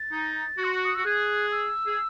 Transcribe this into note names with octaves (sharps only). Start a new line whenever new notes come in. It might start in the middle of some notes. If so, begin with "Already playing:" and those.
Already playing: A6
D#4
F#4
C6
C#6
D#6
F#4 E6
G#4 F#6
E6
G#4